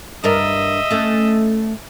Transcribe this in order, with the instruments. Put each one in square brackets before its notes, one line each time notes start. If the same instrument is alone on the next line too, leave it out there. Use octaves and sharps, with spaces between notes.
[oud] G2 D4 A#4 [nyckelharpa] D#5 E5
[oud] A3 C#4